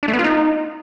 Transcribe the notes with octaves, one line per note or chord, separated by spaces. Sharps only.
D4
A3
B3
F4
D#4